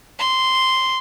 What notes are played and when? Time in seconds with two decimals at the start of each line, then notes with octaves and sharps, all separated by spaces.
0.19 C6